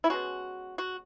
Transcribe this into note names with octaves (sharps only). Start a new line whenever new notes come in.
E4
B2 G#3 C#4 F#4
F#4